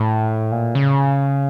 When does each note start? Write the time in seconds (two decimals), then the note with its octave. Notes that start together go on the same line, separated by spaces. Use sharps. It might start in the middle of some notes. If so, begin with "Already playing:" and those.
Already playing: A2
0.52 A#2
0.75 C#3